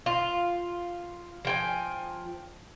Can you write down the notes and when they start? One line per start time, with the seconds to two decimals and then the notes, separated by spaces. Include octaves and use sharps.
0.06 F4
1.45 F3 G5 G#5